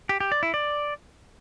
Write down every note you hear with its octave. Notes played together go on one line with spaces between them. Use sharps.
G4
G4
D5
E4
D5